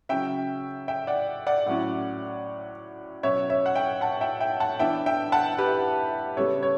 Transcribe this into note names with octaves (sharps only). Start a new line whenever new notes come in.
C#3 F#3 C#4 E5 G5
E5 G5
D5 F#5
D5 F#5
A2 F#3 C#4
B2 F#3 C#4 C#5 E5
C#5 E5
F#5
E5 G5
F#5 A5
E5 G5
E5 G5
F#5 A5
E3 B3 D4 E5 G5
E5 G5
F#5 A5
G4 B4
C#3 G3 B3 A4 C#5
C#5